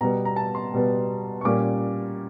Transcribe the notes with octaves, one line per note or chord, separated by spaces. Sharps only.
B2 G3 B3 A#5
A#5
A5
C6
B2 G3 B3
C#6
A#2 G3 A#3 C#4 D6